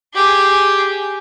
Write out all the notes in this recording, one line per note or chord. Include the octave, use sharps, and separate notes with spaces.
G4 G#4